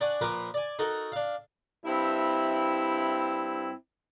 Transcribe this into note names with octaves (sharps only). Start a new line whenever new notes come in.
D4 D5 F#5 G#5 C#6
A#2 F3 A#4 B4 D6
D5 G#5
D#4 F#4 A4 A#4
D4 F5
G2 C4 E4